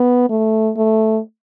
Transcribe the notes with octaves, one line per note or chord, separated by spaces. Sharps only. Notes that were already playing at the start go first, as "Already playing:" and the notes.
Already playing: B3
A3
A3